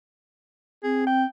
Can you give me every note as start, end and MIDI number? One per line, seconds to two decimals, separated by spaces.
0.83 1.25 60
0.83 1.07 68
1.07 1.25 79